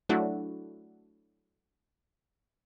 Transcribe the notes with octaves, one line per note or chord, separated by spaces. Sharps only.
F#3 A3 D4 E4 F#4